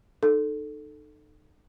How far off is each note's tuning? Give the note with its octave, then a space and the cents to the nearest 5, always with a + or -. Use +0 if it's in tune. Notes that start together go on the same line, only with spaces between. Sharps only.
D#4 -30 A4 +0